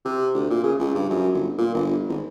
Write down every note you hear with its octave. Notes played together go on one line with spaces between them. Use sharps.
C3
D2
A#2
C#3
C#2
G2
F#2
G1
A#2
G1
G#1